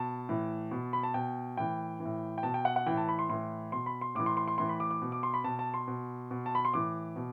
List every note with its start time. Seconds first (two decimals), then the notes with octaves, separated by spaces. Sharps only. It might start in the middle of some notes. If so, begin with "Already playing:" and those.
Already playing: B2 A5
0.29 A2 E3
0.71 B2
0.93 B5
1.03 A5
1.14 B2 G5
1.57 A2 E3 G5
2.00 E3
2.05 A2
2.38 G5
2.43 B2 A5
2.54 G5
2.65 F#5
2.76 F#5
2.86 A2 E3 G5
2.97 A5
3.08 B5
3.19 C6
3.29 A2 E3 C6
3.72 B2 C6
3.86 B5
4.01 C6
4.15 A2 E3 D6
4.26 C6
4.37 C6
4.48 C6
4.58 A2 E3 C6
4.69 B5
4.80 D6
4.91 D6
5.02 B2
5.12 D6
5.23 C6
5.34 B5
5.44 B2 A5
5.59 A5
5.74 C6
5.88 B2
6.31 B2
6.46 A5
6.55 B5
6.65 C6
6.74 A2 E3 D6
7.16 B2